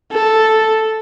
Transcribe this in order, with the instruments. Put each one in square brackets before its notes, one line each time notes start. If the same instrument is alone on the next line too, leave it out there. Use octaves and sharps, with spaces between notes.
[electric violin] A4